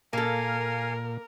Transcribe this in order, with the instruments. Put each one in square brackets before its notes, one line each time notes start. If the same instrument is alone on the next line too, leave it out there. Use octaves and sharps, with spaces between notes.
[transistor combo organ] A#2 [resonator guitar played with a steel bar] A#3 A4 [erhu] A#4 [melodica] F5 G#5